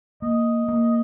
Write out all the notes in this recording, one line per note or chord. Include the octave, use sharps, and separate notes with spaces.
A#3 D#5
A#3